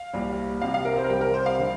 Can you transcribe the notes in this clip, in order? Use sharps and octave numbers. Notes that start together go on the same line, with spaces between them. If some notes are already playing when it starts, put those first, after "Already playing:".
Already playing: F5
C2 A#2 G3
C2 C3 G3 F5
F5
A#4
C5
A#4
C2 C3 G3 G4
A#4
C5
F5
D3 G3